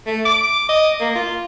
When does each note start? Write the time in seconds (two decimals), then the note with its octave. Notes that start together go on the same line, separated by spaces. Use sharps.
0.07 A3
0.25 D6
0.69 D#5
1.01 A#3
1.15 F4